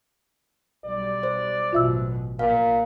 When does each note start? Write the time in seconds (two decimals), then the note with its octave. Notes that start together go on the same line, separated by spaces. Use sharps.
0.85 B1 G3 D5
1.23 C5
1.73 A1 F#2 B2 F4 E5 E6
2.39 A#1 A#2 F5